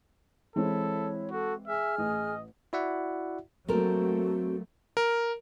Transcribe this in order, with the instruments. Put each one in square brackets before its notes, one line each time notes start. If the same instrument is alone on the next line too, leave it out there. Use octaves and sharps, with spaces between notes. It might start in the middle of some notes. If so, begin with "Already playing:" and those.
[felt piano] E3 G#3 C4 [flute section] E4 C#5 [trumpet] A4
[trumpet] F#4 [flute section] A4
[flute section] G#4 G#5 F6 [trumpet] E5
[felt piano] A1 [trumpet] D#5
[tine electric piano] E4 F#4 D5 E5 F#5
[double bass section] F#3 A3 A#3 [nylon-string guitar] C4 A4 A#4 [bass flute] F#4
[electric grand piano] A#4